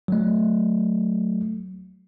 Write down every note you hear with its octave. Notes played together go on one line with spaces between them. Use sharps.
F#3 A3